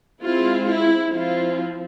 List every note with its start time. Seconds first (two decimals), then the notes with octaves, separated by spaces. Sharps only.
0.22 G#3 C4 E4 F4
0.67 E4
1.12 F3 C4 E4 F4